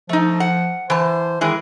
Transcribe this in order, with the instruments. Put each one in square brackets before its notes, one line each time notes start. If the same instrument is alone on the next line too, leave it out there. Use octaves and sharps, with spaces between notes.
[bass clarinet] F3 [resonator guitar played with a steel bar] A3 D#4
[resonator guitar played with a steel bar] F#5
[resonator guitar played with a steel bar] E3 A5 [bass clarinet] C5
[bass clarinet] D#3 [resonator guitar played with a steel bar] E3 G#3 G#4